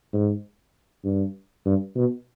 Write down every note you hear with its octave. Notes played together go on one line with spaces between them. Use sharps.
G#2
G2
G2
B2